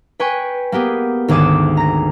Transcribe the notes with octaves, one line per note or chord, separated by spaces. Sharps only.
B4 G5 G#5 C#6
A#3 B3 G4 G#4
G#1 D2 G#4 D6 E7
A#5 A#6